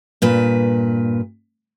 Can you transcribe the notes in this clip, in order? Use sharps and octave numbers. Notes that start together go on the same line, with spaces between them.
G2 A#2 B4